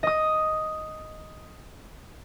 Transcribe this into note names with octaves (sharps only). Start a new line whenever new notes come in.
D#5 D#6